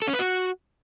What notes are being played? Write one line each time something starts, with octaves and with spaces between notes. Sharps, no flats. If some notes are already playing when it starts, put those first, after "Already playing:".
A4
C#4
B4
F#4